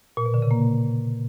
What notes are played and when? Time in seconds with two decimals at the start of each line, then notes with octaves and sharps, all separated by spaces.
0.17 A#2
0.26 B2
0.34 D3
0.42 C#3
0.51 A#3